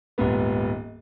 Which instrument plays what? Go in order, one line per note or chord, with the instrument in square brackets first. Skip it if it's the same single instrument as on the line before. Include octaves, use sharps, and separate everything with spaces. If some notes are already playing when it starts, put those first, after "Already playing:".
[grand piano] D#1 G#2 B3